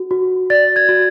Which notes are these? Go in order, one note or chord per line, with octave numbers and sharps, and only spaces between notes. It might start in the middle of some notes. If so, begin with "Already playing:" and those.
Already playing: F#4
F#4
D5 A6
G#6
F#4